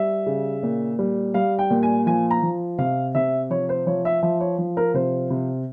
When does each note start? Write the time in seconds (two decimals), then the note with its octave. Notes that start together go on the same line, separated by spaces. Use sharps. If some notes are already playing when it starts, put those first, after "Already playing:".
Already playing: G3 E5
0.26 C#3
0.63 A#2
0.99 G3
1.34 G3 F5
1.59 G5
1.70 A#2
1.83 G#5
2.06 F3 G#5
2.31 A#5
2.43 F3
2.78 C3 F5
3.15 C3 E5
3.50 F3 C#5
3.69 C5
3.86 F3 C#5
4.05 E5
4.23 F3 E5
4.40 C#5
4.58 F3
4.77 A#4
4.94 C3 C5
5.30 C3